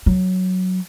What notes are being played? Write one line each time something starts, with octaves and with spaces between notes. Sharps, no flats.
F#3